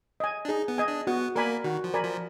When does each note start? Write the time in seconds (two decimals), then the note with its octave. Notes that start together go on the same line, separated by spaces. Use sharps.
0.20 D#5 G#5
0.45 D4
0.49 D#4 G#4
0.68 B3
0.78 D#5 G#5
0.88 D4
1.07 B3 F#4
1.36 A#3 A#4 D5 G#5 B5
1.64 D#3 F#4
1.84 F3
1.94 A#4 D5 G#5 B5
2.03 F3